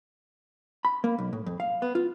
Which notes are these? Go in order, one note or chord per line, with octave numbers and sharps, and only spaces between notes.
B5
A#3
B1
A2
F2
F5
B3
F4